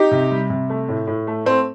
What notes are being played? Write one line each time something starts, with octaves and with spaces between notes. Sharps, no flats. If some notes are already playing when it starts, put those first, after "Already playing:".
Already playing: D#4 G4
C3
G3
C3
A3
A2
A2
A3
A3 C4